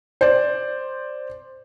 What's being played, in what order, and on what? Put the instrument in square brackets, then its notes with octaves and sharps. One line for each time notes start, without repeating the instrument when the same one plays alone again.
[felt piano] C5 D5